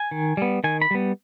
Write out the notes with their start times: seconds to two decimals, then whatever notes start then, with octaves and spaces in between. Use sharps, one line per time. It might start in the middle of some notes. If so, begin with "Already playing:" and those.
Already playing: G#5
0.11 D#3
0.37 G3 B3
0.64 D#3 G#5
0.82 B5
0.91 G3 B3